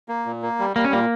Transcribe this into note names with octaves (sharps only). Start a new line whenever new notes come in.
A#3
A#2
A#3
G3
G3 A#3
C#4
A#2 A#3